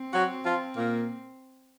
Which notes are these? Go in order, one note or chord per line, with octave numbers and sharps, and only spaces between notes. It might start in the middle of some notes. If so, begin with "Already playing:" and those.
Already playing: C4
F#3 F#4
F3 F4
A#2 A#3